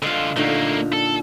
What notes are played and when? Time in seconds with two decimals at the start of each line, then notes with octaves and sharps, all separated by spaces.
0.02 D3 F4 D#5 F5
0.36 A#2 D3 A3 A#3 D#4
0.93 A4